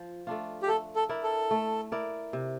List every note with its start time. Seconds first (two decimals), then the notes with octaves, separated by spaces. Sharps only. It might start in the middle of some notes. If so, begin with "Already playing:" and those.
Already playing: F3
0.27 A3 D4 F4
0.63 G4
0.68 A3 A4
0.96 A4
1.09 E4 A#4 D5
1.23 A4
1.51 A3
1.92 E4 A#4 D5
2.33 C3